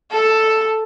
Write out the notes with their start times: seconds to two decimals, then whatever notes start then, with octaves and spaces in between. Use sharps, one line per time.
0.11 A4